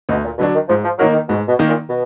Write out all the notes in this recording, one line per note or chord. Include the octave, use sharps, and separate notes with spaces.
D2 B2
A#2
B2 D3 F#3 D4
D#3
G#2 F3
F3
D#3 F#3 A#3 D#4 A#4
D#3
G#2 B2
B2
D#3 A#3 D#4 A#4
A#2
B2